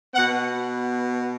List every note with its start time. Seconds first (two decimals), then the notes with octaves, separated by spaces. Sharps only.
0.15 B2 B3 F#5